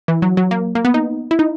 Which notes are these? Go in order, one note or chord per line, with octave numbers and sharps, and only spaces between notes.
E3
F#3
F#3
A#3
A#3
B3
D#4
E4
D#4